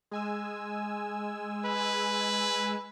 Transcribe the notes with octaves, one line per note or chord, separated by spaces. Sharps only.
G#3 G#5 E6
B4